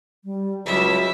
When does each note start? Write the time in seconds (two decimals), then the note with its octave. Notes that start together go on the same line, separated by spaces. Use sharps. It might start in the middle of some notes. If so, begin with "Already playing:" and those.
0.24 G3
0.66 C#2 F#3 E4 E5